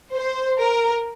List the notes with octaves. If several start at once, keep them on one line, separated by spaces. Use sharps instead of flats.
C5
A#4